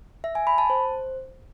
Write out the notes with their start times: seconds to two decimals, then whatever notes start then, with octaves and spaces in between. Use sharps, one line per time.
0.24 E5
0.35 G#5
0.47 B5
0.58 A5
0.70 C5